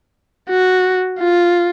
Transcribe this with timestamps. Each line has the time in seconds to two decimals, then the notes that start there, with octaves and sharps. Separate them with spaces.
0.50 F#4
1.20 F4